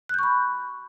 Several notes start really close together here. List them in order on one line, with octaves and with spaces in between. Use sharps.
F#6 G6 C#6 B5